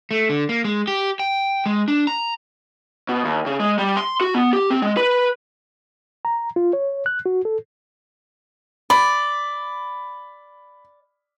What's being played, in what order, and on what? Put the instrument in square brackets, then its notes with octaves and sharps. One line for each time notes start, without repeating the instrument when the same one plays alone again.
[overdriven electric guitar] A3
D3
A#3
G#3
G4
G5
G#3
D4
A#5
[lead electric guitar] B2
D#2
C#3
G#3
G3
C6
F#4
B3
G4
C4
G#3
B4
[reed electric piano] A#5
F4
C#5
F#6
F#4
A4
[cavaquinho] D5 [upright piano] B5